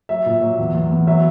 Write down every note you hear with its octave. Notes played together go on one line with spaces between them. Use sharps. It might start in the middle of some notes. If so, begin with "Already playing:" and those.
F#3 E5
A#2
F#3
E2
E2
E2
F#3 E5